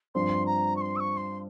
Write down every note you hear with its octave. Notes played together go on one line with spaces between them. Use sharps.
G2 F3 C4 C6
A#5
C#6
C6
E6
C#6
C6